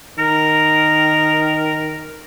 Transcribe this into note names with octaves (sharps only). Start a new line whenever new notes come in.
D#3 A#4